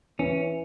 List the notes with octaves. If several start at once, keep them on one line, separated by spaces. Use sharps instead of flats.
E3 C#4